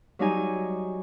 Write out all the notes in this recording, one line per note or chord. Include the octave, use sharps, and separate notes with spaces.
F#3 G3 D#4 G#5